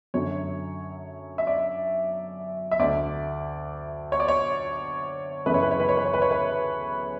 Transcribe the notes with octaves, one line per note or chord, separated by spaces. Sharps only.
F#2 D3 F#3 A3 C#5
E5
D5
E5
D2 D3 A3 D5
C#5
D5
C#5
F#2 C#3 E3 A3 B4
C#5
B4
C#5
B4
C#5
B4
C#5
B4
C#5
B4